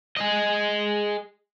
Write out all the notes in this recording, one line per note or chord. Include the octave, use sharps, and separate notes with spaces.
G#4 D#5